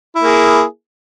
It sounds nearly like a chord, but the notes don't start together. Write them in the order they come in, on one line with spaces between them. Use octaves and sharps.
E4 A#3 G#4